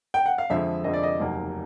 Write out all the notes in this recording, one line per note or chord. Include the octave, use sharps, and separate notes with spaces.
G5
F#5
F5
F2 D3 F3 G#3 E5
F2 D3 F3 G#3 D#5
D5
D#5
F1 D#2 C#3 F#3 A#3